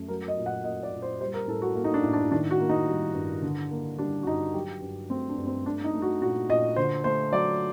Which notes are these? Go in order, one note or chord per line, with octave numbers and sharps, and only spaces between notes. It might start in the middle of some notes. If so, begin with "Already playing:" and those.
Already playing: F#2 A3
F#3 A#4
D#5
A#2
F#5
A#3 D#5
D5
A#2
C5
G3 C5
A#4
A2 A4
F#4
A#3
D#4
D4
A2
D4
D#3 D4
F#4
A#3
D#4
G3
G2
D3
A#3
G3 D4
F#4
G2 D#4
F#3 G4
G2
A3 C4
D4
G2
C4
A3 D4
D#4
A3
F#4
A#2 F#4
A#2 D#5
D3 C5
A3 C5
F#3 D5